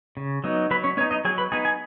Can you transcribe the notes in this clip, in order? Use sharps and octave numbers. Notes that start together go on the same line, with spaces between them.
C#3
F#3 B3 D#4
F#3 B4 B5
C#4 C#5
B3 C#4 D#4 C#5
D#4 D#5
F#3 G#4 G#5
B4 B5
B3 D#4 G#4 G#5
G#4 G#5